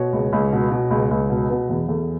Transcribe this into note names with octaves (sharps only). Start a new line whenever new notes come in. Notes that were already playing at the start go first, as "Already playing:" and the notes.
Already playing: B2 C#5
C#2
C#2
B2
B2
C#2
C#2
B2
B2 B4
E2
E2 A4